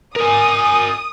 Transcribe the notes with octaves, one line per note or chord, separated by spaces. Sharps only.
A#4 G#5 D#6